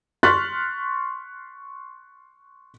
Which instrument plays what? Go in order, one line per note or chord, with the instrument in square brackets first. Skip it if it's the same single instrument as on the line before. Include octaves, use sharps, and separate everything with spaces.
[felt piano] C6 C#6 F6 F#6 A6 B6